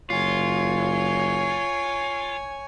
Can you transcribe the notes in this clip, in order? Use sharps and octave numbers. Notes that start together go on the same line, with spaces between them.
F#1 F4 C#5 G#5